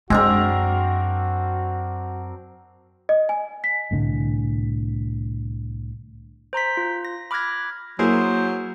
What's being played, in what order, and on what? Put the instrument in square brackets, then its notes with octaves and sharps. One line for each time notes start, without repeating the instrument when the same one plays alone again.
[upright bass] F#2 [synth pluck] G#3 [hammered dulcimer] C4 D4 A#4 [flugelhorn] F#4
[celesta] D#5
G#5
B6
[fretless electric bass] C2 A2 D3
[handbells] C5 A#5 C6 B6
F4
A#6
B5 D6 F6 F#6 G#6 A#6
[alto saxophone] F#3 [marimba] A#3 [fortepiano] E4 G#4 A#4 [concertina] C5